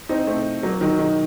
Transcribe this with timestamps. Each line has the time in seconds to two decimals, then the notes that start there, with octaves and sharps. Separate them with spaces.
0.09 C4 D#4
0.27 A3 C4
0.63 F#3 A#3
0.81 D#3 F#3
0.99 D#3